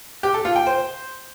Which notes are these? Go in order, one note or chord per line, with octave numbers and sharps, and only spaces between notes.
G4
A4
F4
G5
C5